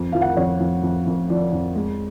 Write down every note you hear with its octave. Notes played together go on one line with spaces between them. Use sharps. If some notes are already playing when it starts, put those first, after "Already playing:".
Already playing: F2
F3 F5
F#5
F2 C#5
F2
F2
F2
F3 D5
F2
G#3